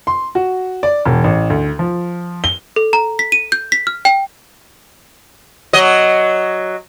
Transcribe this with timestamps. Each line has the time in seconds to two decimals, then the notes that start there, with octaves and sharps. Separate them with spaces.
0.07 C6
0.35 F#4
0.83 D5
1.05 E1
1.24 A1
1.50 D2
1.79 F3
2.44 G7
2.76 A4
2.93 A#5
3.19 B6
3.32 D#7
3.52 G6
3.72 B6
3.87 F6
4.05 G5
5.73 F#3 D#5